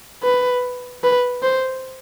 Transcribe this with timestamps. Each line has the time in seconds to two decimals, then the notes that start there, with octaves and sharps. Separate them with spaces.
0.23 B4
1.04 B4
1.43 C5